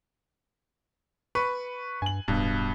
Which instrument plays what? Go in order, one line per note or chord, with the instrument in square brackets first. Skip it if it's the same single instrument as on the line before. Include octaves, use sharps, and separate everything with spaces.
[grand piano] B4 B5 C#6
[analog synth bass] G2 [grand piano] G#5 F#7
[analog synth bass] D1 [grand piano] G2 B2